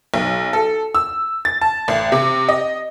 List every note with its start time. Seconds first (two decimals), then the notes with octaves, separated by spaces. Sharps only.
0.14 B1
0.53 A4
0.95 E6
1.45 A6
1.61 A5
1.88 A1
2.12 C3
2.49 D#5